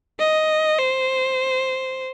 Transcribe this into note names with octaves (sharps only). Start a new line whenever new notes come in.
D#5
C5